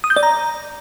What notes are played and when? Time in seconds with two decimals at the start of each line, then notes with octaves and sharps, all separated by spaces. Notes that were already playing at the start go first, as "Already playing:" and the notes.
0.04 D#6
0.10 G6
0.16 D5
0.23 A#5